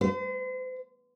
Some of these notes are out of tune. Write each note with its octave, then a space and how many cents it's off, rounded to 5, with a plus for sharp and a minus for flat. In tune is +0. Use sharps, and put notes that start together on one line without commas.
C5 -40